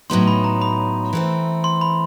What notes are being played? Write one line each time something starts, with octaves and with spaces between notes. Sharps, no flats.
A2 F#3 B3 D#4 C6
B5
A#5
B5
E3 A3 C4
C6
B5